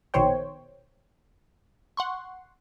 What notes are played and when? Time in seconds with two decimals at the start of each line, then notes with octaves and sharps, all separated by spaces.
0.14 A#1 B2 D#3 C5 C#5 G5
1.97 F#5 C6 C#6